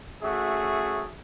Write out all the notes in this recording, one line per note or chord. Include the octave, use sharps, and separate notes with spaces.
A3 C#4 F#4 G#4 E5